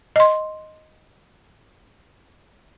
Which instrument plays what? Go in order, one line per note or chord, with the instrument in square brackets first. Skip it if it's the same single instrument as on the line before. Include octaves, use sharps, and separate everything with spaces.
[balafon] D#5 C6